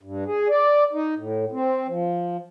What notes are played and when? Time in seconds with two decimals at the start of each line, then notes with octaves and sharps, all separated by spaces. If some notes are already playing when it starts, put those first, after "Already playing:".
0.03 G2
0.26 G#4
0.49 D5
0.93 D#4
1.17 A2
1.52 C4
1.88 F3